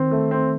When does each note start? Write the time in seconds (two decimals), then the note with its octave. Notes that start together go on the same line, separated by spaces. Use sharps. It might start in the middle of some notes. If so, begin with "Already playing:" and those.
Already playing: D#3 C4
0.11 A3
0.31 C4